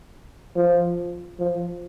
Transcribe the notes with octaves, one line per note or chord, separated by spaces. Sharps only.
F3
F3